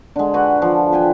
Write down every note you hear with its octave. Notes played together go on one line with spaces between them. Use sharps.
D3 G#3
F#4 B4 F#5 G#5
F3
B4 G5 G#5